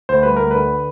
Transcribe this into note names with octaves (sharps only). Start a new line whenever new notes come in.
D2 C5
G3 B4
D2 A#4
D3 B4